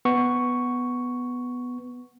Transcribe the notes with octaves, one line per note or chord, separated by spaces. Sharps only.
B3 C#6